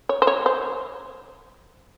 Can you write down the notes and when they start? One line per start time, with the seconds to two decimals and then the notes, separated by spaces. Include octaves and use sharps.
0.09 C#5
0.22 C5
0.27 C#5
0.46 C5